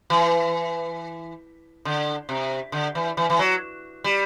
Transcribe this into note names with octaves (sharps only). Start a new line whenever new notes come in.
E3
D3
C3
D3
E3
E3
E3
F#3
G3